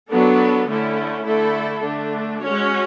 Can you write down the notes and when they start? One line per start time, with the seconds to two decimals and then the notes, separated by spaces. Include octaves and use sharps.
0.10 F#3 B3 D4 A4
0.67 D3 A3 C#4 E4
1.25 D3 A3 E4 A4
1.82 D3 A3 D4
2.40 G#3 C#4 F#4 C#5